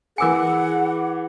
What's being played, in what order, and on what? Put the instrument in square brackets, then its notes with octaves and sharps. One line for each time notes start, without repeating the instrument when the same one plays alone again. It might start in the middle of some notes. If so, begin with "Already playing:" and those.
[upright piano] E3 D6 C#7 [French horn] G#4 [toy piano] A#4 G#5 [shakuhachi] F#5